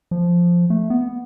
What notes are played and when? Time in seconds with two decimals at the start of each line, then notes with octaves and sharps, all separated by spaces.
0.11 F3
0.70 A3
0.90 B3